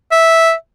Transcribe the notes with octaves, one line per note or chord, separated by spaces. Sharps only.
E5